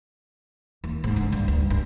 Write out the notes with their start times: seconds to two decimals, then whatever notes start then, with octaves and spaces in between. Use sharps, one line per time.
0.84 D#2
1.04 G#2
1.16 D3
1.32 G2
1.48 D2
1.70 G2